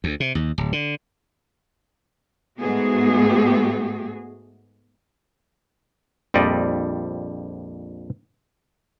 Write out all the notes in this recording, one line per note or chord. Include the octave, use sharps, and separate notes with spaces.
D2
C3
D#2
D1
D3
G#2 A3 B3 F#4 G#4
A#1 F2 G3 D5 D#5